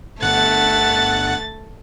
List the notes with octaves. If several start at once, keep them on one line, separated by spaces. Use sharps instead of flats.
G1 A3 F#5 F#6 A6